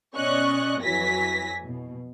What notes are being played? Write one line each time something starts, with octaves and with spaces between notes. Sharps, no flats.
B2 C#4 D5 D#5 C#6 F#6
F2 E3 F#3 G#5 A#6 B6
B2